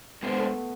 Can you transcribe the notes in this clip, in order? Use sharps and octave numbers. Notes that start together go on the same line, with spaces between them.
G#3 B3 D4 A4 C5
A3